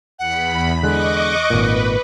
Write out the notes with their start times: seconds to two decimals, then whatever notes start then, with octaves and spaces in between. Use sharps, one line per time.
0.19 E2 F#5 B5
0.83 D3 G#3 D#5 C#6 D6 F#6
1.50 G#1 A#2 B4